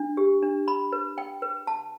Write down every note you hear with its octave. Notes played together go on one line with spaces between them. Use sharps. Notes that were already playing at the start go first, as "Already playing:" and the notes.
Already playing: D4
G4
D4
B5
B4
G5
B4
A5